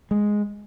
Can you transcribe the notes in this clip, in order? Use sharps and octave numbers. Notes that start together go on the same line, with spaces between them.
G#3